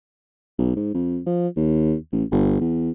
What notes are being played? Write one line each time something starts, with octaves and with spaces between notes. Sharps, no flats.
B1
G#2
F2
F3
D#2
A1
G1
E2